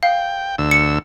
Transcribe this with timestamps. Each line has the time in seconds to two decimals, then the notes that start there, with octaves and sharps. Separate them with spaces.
0.03 F5 G5
0.58 D2 E6
0.71 C#7